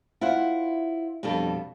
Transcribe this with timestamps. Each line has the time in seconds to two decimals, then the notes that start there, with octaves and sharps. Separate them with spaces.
0.21 E4 F4 C5 F#5
1.23 F2 B2 G3 D4 A4